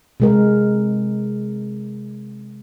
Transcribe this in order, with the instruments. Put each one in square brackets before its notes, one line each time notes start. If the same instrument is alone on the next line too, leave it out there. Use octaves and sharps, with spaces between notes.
[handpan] C3 G#3 A#4